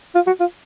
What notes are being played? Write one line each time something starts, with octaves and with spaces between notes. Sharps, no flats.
F4
F#4
F4